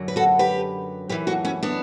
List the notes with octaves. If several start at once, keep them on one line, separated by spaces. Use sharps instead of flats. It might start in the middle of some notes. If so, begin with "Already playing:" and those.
Already playing: F#2 D3 F#3
B4
F#4 A4
G4 B4
F#2 E3 G4 B4
F#4 A4
C#4 E4
B3 D4